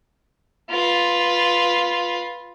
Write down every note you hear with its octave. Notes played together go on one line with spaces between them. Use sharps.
F4 B4